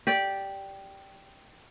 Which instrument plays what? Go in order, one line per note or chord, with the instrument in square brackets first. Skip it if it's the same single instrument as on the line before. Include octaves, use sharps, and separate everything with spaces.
[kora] G4 D5